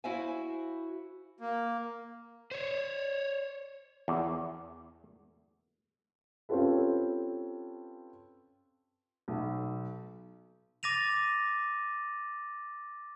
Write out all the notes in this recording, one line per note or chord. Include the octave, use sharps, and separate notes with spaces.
E4 F#4 C5 E5 F5 G#5
A#3
C5 C#5
E2
C4 C#4 F4 G4 A4 B4
B1
D6 A6 A#6 D#7 F7